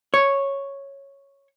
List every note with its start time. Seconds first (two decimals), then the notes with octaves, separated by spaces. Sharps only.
0.14 C#5